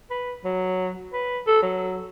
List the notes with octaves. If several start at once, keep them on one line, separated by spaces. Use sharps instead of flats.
B4
F#3
B4
A4
F#3